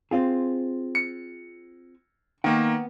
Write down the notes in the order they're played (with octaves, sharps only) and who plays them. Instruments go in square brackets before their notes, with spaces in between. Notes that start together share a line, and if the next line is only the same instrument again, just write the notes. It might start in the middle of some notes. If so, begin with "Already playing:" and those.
[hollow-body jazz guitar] C4 F4 G#4
[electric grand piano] C#7
[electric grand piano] D#3 A#3 [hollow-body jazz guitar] B3 G5